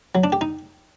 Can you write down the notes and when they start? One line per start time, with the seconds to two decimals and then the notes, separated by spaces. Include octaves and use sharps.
0.15 F#3
0.24 D4
0.32 G4
0.41 D#4